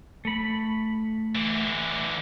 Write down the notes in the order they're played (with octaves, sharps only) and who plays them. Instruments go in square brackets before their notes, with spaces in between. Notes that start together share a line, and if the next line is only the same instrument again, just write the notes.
[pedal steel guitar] A3 B5
[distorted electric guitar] D3 E3